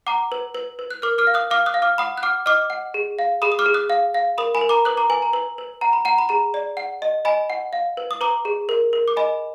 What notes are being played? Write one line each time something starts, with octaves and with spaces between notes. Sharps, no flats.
F#5 A#5 D6
B4
B4
B4
F#6
A#4 D6 F6
D6 F6
F5
D#6 F#6
F5 D6 F6
D#6 F#6
F5
D6 F6
F#5 B5 D#6
F#6
F#5 D6 F6
D#5 D6 F6
F#5
G#4
F5
G#4 B5 D#6
D#6
D6 F6
G#4
D#6 F#6
F5
F5
A#4 B5 D#6
G#5 B5
A#4
A#5 D6
B4 D#6 F#6
A#5 D6
B4 G#5
A#5
B4
B4
F#5 A#5
B5
F#5 A#5
B5
G#4 A#5
D5
F#5
D#5
D#5 G#5 B5
F#5
F5
B4
D#6
B4 A#5 D6
G#4
A#4
A#4
D6
D#5 G#5 B5